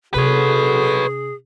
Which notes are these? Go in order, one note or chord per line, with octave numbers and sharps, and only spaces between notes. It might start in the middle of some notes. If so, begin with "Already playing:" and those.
C3 D4 F#4 G#4 A4 B4 C#5